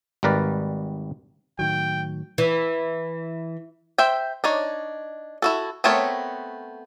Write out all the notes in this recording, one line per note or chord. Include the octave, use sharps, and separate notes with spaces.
G#1 G3 A#4 B4 D5
A2 D#3 F#3 G5
E3
C5 E5 G5
D4 D#4 C#5
E4 F#4 A4
A3 B3 C4 A#4 C#5